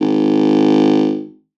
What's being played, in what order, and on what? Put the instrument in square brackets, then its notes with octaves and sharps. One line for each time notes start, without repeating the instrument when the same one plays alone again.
[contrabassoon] G#1